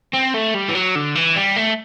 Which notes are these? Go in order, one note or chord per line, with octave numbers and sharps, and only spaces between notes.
C4
A3
G3
E3
F#3
D3
E3
G3
A3